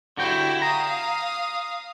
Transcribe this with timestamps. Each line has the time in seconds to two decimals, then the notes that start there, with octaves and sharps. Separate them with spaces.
0.17 D3 E4 F#4 G4 G5
0.62 F5 A#5 D#6